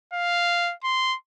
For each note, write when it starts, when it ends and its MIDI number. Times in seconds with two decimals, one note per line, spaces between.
0.13 0.73 77
0.84 1.16 84